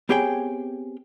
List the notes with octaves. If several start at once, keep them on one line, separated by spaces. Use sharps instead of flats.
B3 C4 G4 G#4 C#5 G5